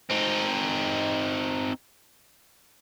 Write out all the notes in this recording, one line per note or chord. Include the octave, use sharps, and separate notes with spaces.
C4 D#4